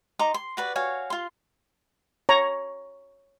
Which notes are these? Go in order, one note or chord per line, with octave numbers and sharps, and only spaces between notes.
D#4 A#5 C6 D6
C6
F#4 B4 D5
F#4 C#5 F5 G#5
F4 C6
C#5 A#5